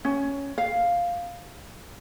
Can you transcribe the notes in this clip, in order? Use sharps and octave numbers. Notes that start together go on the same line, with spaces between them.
C#4
F5